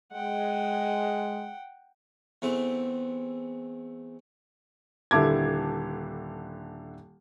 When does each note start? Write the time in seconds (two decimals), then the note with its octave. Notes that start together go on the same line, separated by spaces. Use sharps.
0.13 G#3 F#5 G5
2.42 E2 A3 C4
5.11 D#1 D3 E4 A5 D6 G#6